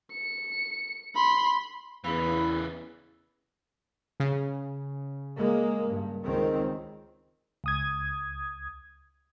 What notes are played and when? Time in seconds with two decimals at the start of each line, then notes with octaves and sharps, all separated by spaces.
0.12 C#7
1.15 B5 C6
2.04 E2 C#3 E3 E4 B4 F5 B5
4.20 C#3
5.36 G#3 A#3
5.89 G2
6.25 C#2 D#3 C4
7.64 C#2 D#6 G#6